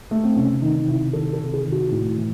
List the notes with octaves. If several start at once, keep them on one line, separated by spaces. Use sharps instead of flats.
A3
C4
C3 C#4
D#3 D#4
C3 E4
D#3 A4
A4
C3
G#4
D#3
F#4
A2
E3